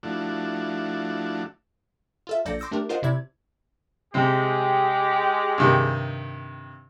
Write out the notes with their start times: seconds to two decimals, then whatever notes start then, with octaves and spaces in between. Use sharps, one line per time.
0.03 F3 A3 D4 E4 F#4
2.27 F4 A4 E5
2.45 A#1 A4 D5 G6 A#6 C#7
2.59 C6 D6 E6 G6 A#6
2.71 A3 D4 G4 A#4
2.89 F4 A#4 C5 D#5 F#5
3.02 C3 E4 D5 G#6
4.14 C3 G#3 C4 G4
5.58 G2 C3 D#3